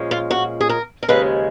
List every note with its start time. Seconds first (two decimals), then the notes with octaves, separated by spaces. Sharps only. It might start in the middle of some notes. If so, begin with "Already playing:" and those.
Already playing: A#2 F3 G#3 C#4
0.11 F4
0.30 F#4
0.61 G#4
0.69 A#4
1.03 A#4
1.08 D#2 C#3 F3 G#3 B4